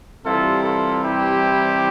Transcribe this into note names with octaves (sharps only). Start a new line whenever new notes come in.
C3 E3 G3 C4 E4 F4 A4
F4 A4
E4 G4